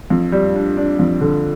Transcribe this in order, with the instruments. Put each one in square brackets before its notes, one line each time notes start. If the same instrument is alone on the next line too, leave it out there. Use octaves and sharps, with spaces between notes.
[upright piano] F2
G3
D4
D4
F2
D3